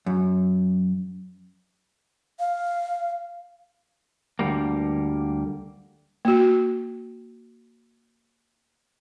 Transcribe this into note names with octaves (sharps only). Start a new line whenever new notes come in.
F#2
F5
D2 D3 G3 A#3
A#3 F#4